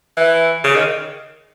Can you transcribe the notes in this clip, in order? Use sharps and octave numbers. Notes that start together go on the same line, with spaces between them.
E3
C#3
D#3